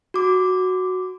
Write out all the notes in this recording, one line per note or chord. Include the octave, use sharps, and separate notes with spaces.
F#4 D6